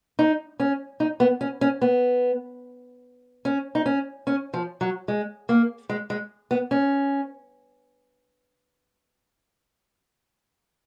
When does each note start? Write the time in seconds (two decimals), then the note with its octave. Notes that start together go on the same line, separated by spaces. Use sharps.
0.19 D#4
0.60 C#4
1.00 D#4
1.20 B3
1.41 C#4
1.61 C#4
1.82 B3
3.45 C#4
3.75 D#4
3.86 C#4
4.27 C#4
4.54 F3
4.81 F#3
5.08 G#3
5.49 A#3
5.89 G#3
6.10 G#3
6.51 B3
6.71 C#4